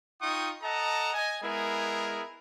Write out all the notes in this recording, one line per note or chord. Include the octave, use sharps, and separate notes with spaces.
D#4 F4 G5 C#6 D#6
A4 D#5 F#5 A5 A#5
D#5 G#5
G#3 B3 E4 G#4 A#4